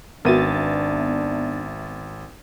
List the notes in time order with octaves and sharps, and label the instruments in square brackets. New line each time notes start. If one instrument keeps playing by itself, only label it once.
[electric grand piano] G#1 D#7 [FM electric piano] B3 E5 A6 [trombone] D4 [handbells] F#4 A#4